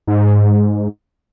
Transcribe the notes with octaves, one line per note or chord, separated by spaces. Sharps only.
G#2